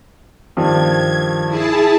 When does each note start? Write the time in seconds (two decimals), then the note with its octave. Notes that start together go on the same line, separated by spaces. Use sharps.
0.57 G2 D#3 F3 G#6
1.48 E4 G#4 A5